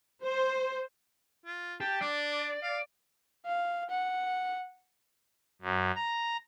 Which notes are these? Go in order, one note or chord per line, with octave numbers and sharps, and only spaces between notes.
C5
F4
G4 A5
D4 D5
F5
F5
F#5
F#2
A#5